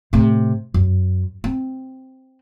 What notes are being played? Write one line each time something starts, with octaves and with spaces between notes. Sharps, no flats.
A2 C3
F#2
C4